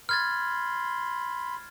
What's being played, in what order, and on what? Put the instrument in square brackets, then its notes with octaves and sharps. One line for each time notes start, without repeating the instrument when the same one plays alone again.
[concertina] B5 C6 [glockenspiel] F6 G#6 A6